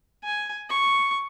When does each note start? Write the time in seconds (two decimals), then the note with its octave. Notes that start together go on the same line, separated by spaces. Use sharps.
0.24 G#5
0.70 C#6